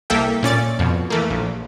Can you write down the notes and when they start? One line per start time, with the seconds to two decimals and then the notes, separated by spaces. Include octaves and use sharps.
0.10 C2 A#3 A4 E5 G5
0.43 A#2 C#4 D5 A6
0.79 F2 B2
1.10 E3 A3 A#3
1.30 A#1